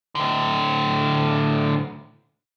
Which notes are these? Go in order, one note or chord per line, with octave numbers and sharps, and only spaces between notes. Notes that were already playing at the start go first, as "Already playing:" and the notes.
A2 D3